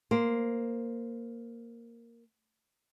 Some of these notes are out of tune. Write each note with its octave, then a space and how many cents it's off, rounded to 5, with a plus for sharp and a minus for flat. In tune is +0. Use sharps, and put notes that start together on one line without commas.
A#3 +0 C5 -5